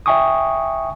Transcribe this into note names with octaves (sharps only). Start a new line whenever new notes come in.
E5 G5 G#5 C#6 D#6